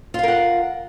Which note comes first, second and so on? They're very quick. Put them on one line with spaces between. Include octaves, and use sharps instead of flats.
F4 F5 A#4 F#5